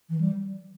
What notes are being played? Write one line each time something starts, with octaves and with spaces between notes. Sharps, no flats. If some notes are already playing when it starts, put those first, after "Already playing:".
E3
G3